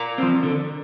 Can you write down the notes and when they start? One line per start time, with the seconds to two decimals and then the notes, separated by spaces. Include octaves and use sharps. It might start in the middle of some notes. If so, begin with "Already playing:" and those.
Already playing: A#4 D5
0.18 F3 C4
0.43 D3